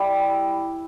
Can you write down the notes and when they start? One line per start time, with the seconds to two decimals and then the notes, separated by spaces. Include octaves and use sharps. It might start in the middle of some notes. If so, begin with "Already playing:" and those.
Already playing: G3 E4 G4